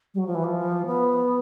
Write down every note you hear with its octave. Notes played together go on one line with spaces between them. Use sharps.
G3
F#3
F3
E3
F3
B3